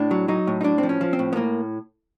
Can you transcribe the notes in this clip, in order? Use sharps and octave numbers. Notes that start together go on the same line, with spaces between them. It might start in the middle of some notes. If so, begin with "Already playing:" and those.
Already playing: A2 D4
F#3
F#3 D#4
A2
D#4
A2 D4
C4
F3
C#4
F3
C4
A2
B3
A2 A#3